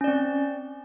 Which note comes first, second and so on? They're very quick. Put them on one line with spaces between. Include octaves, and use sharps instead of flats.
C#4 D5 C4